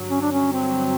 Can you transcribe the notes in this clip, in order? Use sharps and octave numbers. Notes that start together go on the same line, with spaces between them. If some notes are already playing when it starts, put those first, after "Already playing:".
Already playing: G2 D3 F#3
C#4
D4
C#4
C4